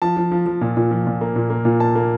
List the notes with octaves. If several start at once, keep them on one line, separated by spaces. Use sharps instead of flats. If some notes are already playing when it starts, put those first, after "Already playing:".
F3 A5
F3
F3
F3
A#2
A#2
F3
A#2
A#3
A#2
A#3
A#2
A#2 A5
A#3